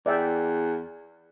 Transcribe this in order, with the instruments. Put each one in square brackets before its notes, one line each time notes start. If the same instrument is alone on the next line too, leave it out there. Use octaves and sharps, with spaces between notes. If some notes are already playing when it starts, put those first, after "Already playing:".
[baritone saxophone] E2 [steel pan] D5 E5 G5